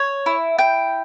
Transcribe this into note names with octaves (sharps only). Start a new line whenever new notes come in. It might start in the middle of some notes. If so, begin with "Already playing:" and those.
Already playing: C#5
E4
G5